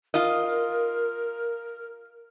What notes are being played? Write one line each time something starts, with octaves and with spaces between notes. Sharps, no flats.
F4 A#4 D#5